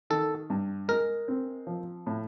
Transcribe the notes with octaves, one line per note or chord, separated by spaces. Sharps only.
D#3 A4
G2
G#3 A#4
C4
F3
A2